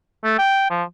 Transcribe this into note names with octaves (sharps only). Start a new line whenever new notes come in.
A3
G5
F3